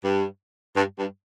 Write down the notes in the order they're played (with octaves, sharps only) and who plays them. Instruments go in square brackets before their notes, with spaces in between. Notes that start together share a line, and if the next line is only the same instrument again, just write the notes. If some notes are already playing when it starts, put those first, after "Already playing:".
[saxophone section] G2
G2
G2